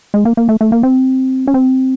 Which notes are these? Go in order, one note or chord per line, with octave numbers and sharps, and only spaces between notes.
G#3
A#3
A#3
A3
A3
A#3
C4
C#4
C4